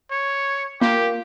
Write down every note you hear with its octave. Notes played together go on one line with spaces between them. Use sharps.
C#5
A#3 F4 G4